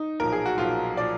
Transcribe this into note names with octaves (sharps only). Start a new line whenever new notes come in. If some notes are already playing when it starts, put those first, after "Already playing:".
Already playing: D#4
B1 A#2 F3 A#4
G#4
F#4
B1 A#2 F3 F4
A#2 F3 D5